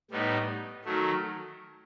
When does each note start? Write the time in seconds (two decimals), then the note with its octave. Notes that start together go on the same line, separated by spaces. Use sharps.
0.11 A2 G3 B3 D#4
0.85 D#3 F#3 A3